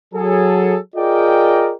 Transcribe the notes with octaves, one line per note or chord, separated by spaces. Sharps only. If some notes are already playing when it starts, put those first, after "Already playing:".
F#3 G#4 A4
F4 G#4 A#4 D5 D#5 G5